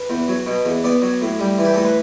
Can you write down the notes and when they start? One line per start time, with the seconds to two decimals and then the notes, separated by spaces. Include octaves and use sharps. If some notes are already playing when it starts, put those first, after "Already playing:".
Already playing: B4
0.10 E2
0.28 F#3
0.46 B2
0.65 E2
0.84 B3 D5
1.02 F#3
1.22 A2
1.40 G3
1.58 E3
1.64 G4
1.74 A2 A4
1.85 B4